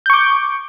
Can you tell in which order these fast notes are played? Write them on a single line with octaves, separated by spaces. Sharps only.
G6 C#6 D6